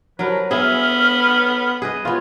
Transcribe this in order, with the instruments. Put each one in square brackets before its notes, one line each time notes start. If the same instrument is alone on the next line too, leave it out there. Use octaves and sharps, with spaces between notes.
[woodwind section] C2 F3 B4 [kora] F#3 A#4
[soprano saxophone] B3 [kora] G#4 E5 [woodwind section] F6
[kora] G#4 B4 D#5
[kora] B3 F4 [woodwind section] C#4 G4 C#5